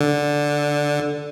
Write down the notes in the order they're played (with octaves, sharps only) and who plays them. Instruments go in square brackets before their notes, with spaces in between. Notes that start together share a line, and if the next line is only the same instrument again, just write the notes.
[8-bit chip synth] D3